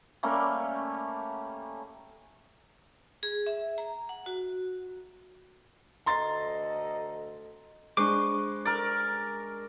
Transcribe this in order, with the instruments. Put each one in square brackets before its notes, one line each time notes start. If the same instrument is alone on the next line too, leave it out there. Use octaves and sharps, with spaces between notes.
[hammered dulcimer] G3 A3 A#3 C#4
[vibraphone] G#4
E5
A#5
F#5
F#4
[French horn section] D2 A4 D#5 [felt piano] A#5 C6 A6
[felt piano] G#3 D4 [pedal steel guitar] B4 C5 D6 [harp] B5 C#6
[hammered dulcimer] A#4 D5